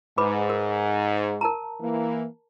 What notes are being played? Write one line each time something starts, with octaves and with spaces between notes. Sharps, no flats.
G#2 B4 B5 D6
A#4
A#4 A5 A#5
E3 A#3